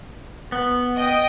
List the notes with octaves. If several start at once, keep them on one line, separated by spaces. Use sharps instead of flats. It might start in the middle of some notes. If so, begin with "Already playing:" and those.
B3
D#5 G5